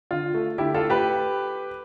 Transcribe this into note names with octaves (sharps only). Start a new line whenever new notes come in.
D3 F4
A3
D3 E4 G4
F4 A4
A3
G4 B4